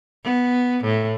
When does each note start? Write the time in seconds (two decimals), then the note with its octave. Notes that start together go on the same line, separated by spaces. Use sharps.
0.24 B3
0.84 A2